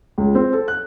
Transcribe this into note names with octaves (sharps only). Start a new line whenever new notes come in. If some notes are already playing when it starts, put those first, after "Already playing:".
C#2
C4
A4
F#6